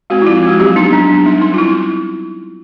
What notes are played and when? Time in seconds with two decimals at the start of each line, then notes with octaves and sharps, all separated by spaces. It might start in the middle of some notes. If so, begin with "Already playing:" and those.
0.10 G#3 C4 F#4
0.22 E4
0.27 F3 F4
0.38 C4 F4
0.48 G#3 F#4
0.60 F#3 G4
0.76 B3 D4 D#4
0.93 F#3 D4
1.09 B3 D4
1.26 G3 D#4
1.42 C4 D#4
1.54 F4
1.58 G3 E4